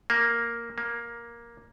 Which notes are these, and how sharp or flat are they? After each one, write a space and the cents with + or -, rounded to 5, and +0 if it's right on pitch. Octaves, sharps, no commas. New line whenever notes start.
A#3 +0
A#3 +10